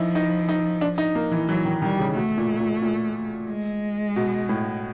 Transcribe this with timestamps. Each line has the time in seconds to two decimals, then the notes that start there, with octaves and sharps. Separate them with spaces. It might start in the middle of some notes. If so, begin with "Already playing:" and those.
Already playing: F3 D#4 E4
0.15 D#4
0.49 D#4
0.81 D4
0.98 D#4
1.15 A#3
1.32 E3
1.48 E3 F#3
1.65 D#3
1.82 D#3 G3
1.99 C#3
2.16 B2 A3
2.38 A#2
2.60 A#2
2.82 A#2
3.49 G#3
4.16 B2
4.49 A2